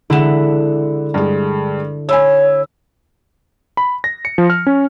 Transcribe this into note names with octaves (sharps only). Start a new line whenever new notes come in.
D3 G#3 E4 F#5 E7
G2 G#3
C#5 G#5 B5 E6
B5
A#6
C#7
F3
F6
C#4